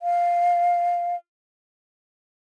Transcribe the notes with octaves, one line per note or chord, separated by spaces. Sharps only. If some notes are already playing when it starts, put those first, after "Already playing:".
F5